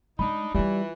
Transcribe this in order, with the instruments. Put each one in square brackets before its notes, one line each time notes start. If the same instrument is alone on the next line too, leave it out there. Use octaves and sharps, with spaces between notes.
[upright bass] G#3 [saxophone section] D4 D#4 [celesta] B5
[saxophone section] E3 [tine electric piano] G3 [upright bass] D#4 F4